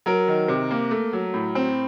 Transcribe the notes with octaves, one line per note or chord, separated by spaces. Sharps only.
F#3 A#4
D#3
C3
A#3
A3
F#3
A2
C4